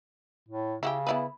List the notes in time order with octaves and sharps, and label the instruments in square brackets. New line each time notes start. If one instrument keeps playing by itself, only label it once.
[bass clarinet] A2
[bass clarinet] C#3 [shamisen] E4 F#4 G4
[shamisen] B3 E4 B4